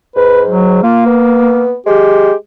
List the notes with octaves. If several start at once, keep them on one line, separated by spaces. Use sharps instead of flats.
G#2 B4
F#3
A#3 F4
B3
G#3 G4